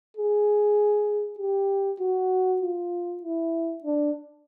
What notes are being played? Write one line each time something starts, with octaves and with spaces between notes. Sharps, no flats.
G#4
G4
F#4
F4
E4
D4